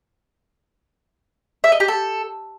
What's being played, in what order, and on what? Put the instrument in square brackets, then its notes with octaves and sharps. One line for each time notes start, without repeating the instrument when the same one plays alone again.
[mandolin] E5
D#5
G4
A4